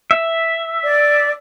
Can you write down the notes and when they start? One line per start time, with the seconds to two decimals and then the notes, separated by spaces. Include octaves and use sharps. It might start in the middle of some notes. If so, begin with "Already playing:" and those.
0.11 E5
0.83 D5